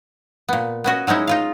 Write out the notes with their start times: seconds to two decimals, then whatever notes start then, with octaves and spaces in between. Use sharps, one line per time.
0.49 A#2 B3
0.84 B3 C#4 F#4 D#5
1.07 F#3 G#3 C#4 D#4 E4
1.27 D#4 F4 F5